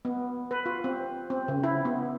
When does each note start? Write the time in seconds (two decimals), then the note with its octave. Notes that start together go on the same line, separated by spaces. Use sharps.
0.05 B3
0.51 B4
0.66 F4
0.84 C4
1.30 C4
1.48 C#3
1.63 E4
1.85 B3